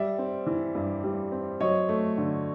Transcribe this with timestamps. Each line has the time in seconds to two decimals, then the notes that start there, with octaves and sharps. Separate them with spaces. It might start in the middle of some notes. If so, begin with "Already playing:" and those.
Already playing: G3 D5 E5
0.18 C4
0.46 E3
0.75 G2
1.04 G3
1.32 C4
1.60 F#3 C#5 D#5
1.89 A3
2.18 D3